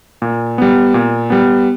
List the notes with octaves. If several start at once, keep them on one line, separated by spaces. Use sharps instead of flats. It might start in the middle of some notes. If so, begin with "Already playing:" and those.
A#2
G3 B3
A#2
G3 B3